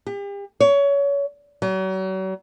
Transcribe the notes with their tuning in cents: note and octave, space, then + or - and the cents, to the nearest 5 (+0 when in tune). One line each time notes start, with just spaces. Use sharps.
G4 +40
C#5 +25
F#3 +40